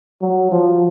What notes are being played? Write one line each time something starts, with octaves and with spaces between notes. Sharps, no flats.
F#3
F3